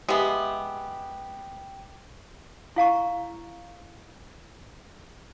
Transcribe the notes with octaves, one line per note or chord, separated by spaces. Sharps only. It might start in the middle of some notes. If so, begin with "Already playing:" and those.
G#3 B3 G4 E5
E4 F5 A#5 C#6